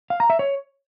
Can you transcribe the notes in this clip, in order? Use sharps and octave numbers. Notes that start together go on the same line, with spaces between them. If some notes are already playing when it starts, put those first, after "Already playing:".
F5
A#5
E5
C#5